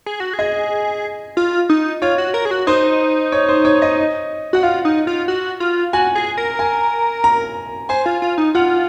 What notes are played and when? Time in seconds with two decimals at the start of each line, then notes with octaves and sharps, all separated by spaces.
0.06 G#4
0.20 F#4
0.34 G#4
0.39 D#5
1.37 F4
1.69 D#4
2.02 F4 C#5
2.18 F#4
2.34 A#4
2.45 G#4
2.51 F#4
2.67 D#4 C5
3.32 C#5
3.49 C5
3.65 C#5
3.82 D#5
4.53 F#4 F#5
4.63 F4 F5
4.85 D#4
5.07 F4
5.28 F#4
5.60 F4
5.93 F#4 G#5
6.15 G#4
6.38 A#4
6.59 G#5
7.24 A#5
7.89 C5 G#5
8.06 F4
8.22 F4
8.38 D#4
8.55 F4 F#5